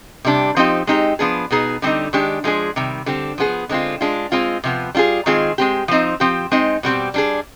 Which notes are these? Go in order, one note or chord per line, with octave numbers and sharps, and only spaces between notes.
C3 G3 D4
F3 C4 D#4 G4
G#3 C4 D#4 G4
F3 B3 D4 G#4
B2 B3 D#4 G#4
D3 G3 C4 D#4
D#3 G#3 D4 G4
F3 G#3 D4 G#4
C3 D#3 G3
D3 G3 C4
F3 B3 F4 G#4
D3 G#3 C4 F4
G#3 D4 F4
G#3 C4 F4
C3 F3 B3
G3 D4 F4 G#4
D#3 G#3 C4 F4 G#4
G#3 C4 G4
F3 C4 D#4
F3 C4 G4
G#3 C4 D#4
B2 G3 C4 G4
G3 D4 G#4